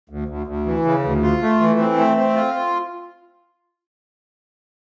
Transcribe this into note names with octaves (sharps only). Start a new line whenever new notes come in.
D2
D2
D2
E3
C#3
D2
F4
A3
E3
C4
A3
C4
F4